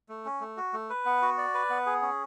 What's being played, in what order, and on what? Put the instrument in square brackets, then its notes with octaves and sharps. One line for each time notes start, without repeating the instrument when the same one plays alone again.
[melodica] A3
C#4
A3
F#4
A3
B4
B3
F#4
D5
B4
B3
G#4
C#4